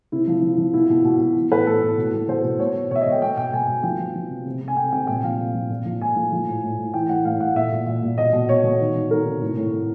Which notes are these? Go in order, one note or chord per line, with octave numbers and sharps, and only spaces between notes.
C3 E4
F3
F3
F3
B2 E4
B2
B2
B2
E3
A2 B4
A2 A4
A2
B2
B2
B2 C5
B2
B2 C#5
B2
B2 C#5 E5
D#5
B2
G5
B2 G5
B2 G5
B2 G#5
B2
F3 G5
F3
F3
C3
C3
C3
G#5
C3 G5
C3 G5
A#2 G5
F3 F5
F3
F3
A#2
F3
A#2 G#5
F3
F3
A2
A2
A2
E3 G5
A2 F#5
A2 F5
A2 F#5
A#2 E5
A#2
A#2
A#2
B2 D#5
B2
B2 C#5
B2
D#3
D#3
D#3 A#4
C3
A2
A2
A2